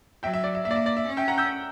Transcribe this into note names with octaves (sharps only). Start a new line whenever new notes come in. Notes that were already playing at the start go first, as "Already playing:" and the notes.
F#3 E5 G5
E5
D5
E5
A#3 E5
D5
E5
D5
E5
C#4
E5 G5
F#5 A#5
E6 G6